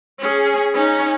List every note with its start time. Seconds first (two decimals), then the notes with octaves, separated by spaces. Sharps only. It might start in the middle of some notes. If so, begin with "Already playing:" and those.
0.19 C#4 G#4
0.74 C#4 D#4